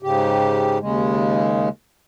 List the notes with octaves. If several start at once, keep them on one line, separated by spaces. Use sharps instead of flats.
G#2 C#3 G4
D#2 C#3 G#3